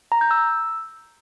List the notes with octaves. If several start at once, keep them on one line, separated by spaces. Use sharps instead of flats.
A#5
G6
E6